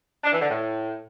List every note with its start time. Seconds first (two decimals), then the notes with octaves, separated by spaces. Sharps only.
0.24 D4
0.32 E3
0.41 D3
0.49 A2